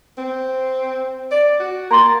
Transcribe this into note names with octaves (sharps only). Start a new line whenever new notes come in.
C4
D5
F#4
A#3 A#5 C6 A6